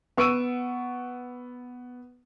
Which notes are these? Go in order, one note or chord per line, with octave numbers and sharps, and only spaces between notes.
B3 C#6 E6 D7 D#7